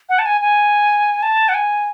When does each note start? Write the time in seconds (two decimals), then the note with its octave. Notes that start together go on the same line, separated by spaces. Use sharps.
0.09 F#5
0.19 A5
0.26 G#5
0.41 G#5
1.22 A5
1.49 F#5
1.54 G#5